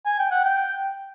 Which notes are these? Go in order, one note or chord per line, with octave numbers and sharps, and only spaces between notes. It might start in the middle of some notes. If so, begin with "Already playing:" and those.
G#5
G5
F#5
G5